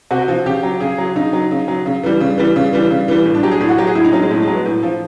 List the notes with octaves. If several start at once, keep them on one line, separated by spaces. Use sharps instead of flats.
C3 F#4
F3
C#3 G4
F#3
C#3 G#4
F#3
C#3 D#4
F#3
C#3
F#3
C#3
E3 G3
C#3
E3 G3
C#3
E3 G3
C#3
E3 G3
A2
D4
F#3 G4
G#4
A2
F#4
F#3 G4
G#4
A2 E4
D#4
F#3 C#4
G#3
A2 A3
G#3
F#3
B3
A2
F3